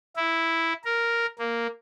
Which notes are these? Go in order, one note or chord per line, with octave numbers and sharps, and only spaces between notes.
E4
A#4
A#3